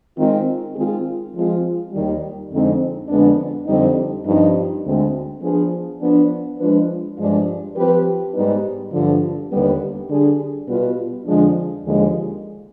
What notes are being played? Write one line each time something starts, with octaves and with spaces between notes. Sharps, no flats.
D#3 G#3 C4 F4
D#3 G#3 C4 F4 G#4
F3 G#3 C4 F4 G#4
D#2 D#3 G3
F2 D3 G#3 C4 D#4
F2 D3 G#3 B3 D4
F2 D3 G3 C4 D#4
G2 F3 C4 D#4
D2 D3 G#3 C4
F3 B3 D4 G#4
F3 B3 D4
F3 G#3 D4 F4 B4
G2 F3 G#3 D4 F4
F3 C4 G4 B4
G#2 G3 B3 D#4 B4
G2 D3 F3
D#2 D3 G3 B3
D3 G3 D4 G#4
B2 G3 B3 F4 B4
F2 D3 F3 G#3 D4
D#2 D3 F3 G#3